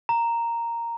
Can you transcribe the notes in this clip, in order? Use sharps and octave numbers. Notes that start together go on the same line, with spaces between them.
A#5